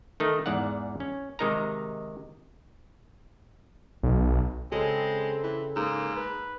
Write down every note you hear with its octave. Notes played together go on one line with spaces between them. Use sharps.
D#3 A3 D#4
E2 G#2 D5 F5 F#5
C#4
C3 D#3 G#3 D#4 A#4 A#5
B1
C#3 G#3 C4 G#4 A4
E3
G#2 A#3
B4